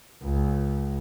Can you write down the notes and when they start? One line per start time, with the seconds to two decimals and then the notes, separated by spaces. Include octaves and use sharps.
0.23 C#2